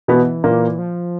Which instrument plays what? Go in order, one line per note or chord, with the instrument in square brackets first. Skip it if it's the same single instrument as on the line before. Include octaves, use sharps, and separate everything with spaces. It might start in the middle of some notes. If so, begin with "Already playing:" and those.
[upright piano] B2 B3 [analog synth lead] E3
[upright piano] A#2 A#3
[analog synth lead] F3